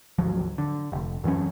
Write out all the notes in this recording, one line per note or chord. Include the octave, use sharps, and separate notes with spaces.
G#1 D2 F3 F#3
D3
F1
F#2 E3 F#3 C#4